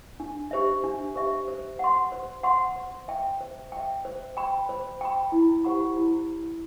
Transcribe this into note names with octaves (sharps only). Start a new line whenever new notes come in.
D4
G4 C5 E5
D4
G4 C5 E5
C5
F#5 C6
C5
F#5 C6
C5
E5 G5
C5
E5 G5
C5
G5 B5
C5
G5 B5
E4
G4 C5 F#5 B5
E4